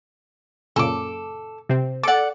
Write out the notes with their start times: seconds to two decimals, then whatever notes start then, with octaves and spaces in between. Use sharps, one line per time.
0.76 F#2 A#2 C#3 A4 D6
1.69 C3 C4
2.03 A4 D5 F#5 D6